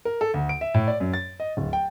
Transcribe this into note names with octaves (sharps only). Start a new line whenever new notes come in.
A#4
A4
D2
D7
E5
A2
D5
F#2
A6
D#5
D1
G5